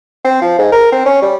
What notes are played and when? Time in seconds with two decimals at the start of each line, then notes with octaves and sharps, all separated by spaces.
0.25 C4
0.41 F3
0.59 G#2
0.72 A#4
0.92 C4
1.06 C#4
1.22 G3